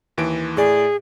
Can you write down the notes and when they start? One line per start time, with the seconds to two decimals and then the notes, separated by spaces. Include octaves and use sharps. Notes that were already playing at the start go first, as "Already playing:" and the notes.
0.18 D#2 E3 D7
0.57 A2 G#4 D5